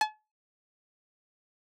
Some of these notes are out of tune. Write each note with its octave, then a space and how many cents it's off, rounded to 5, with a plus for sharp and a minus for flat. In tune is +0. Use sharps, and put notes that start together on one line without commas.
A5 -45